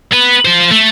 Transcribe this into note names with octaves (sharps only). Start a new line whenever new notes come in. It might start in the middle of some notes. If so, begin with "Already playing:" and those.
B3 B4
F4 C5
A3